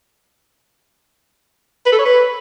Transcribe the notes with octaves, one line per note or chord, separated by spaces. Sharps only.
B4
A4
C#5
B4